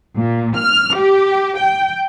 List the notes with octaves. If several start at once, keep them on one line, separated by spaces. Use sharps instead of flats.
A#2
F6
G4
G5